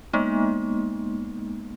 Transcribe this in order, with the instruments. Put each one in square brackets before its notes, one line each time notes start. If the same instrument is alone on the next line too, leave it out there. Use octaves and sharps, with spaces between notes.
[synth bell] G#3 A#3 B3 D#4